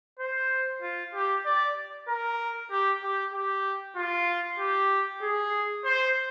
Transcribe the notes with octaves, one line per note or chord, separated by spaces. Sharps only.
C5
F4
G4
D5
A#4
G4
G4
G4
F4
G4
G#4
C5